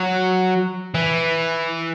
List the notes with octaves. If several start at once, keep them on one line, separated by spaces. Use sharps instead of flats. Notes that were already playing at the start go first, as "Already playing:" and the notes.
Already playing: F#3
E3